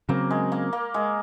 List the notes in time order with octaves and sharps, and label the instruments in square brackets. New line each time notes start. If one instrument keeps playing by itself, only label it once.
[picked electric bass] C#3 F#3 C4 [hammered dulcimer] A#3
[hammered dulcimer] G#3
A#3
A#3
G#3